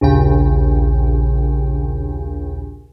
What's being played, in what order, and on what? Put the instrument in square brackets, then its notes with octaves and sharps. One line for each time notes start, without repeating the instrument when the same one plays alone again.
[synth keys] A#1 D#2 C#3 G5